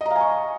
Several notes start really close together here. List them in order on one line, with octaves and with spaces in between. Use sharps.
D#5 A#5 F5 G#5 C#6